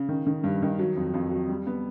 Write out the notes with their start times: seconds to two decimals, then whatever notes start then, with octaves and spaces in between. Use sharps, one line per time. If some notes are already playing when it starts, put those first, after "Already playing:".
Already playing: C#3
0.09 D#3
0.27 D#3
0.44 G2
0.62 D#3
0.79 F#3
0.96 F2
1.14 F2
1.31 F#3
1.49 G3
1.66 B3